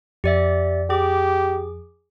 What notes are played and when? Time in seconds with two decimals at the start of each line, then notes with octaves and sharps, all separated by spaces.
0.24 F2 G4 D5 E5
0.90 G4 G#4 D6